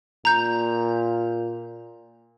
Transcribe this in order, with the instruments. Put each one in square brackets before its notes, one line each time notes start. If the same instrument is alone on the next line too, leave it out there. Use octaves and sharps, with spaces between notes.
[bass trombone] A#2 [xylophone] A#5 G6